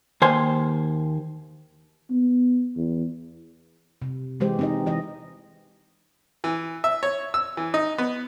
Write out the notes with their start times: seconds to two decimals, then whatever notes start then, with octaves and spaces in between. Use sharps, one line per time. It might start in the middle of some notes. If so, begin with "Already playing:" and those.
0.22 D#2 C5 G#5
2.11 B3
2.76 E2
4.02 C3
4.40 E3 G#3 G4 C5
4.59 C4 D#4 D#5
4.86 E3 D#5
6.44 E3
6.84 E5
7.03 C#5
7.34 E6
7.57 E3
7.74 D#4
7.98 B3